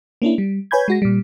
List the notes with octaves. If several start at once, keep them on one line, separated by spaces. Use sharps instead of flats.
A#3 C#4 D4 E4
G3
B4 C#5 G#5 B5 G6 G#6
G#3 F#4 A#6
A#2 G3